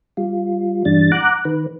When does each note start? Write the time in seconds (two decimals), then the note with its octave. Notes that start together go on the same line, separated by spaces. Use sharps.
0.17 G3 F4
0.85 G2 E3 G3 D4 A6
1.12 F#5 A#5 D6 F#6
1.45 D#3 B4